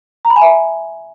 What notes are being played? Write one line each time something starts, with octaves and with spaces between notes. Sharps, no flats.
A#5
B5
G#5
E5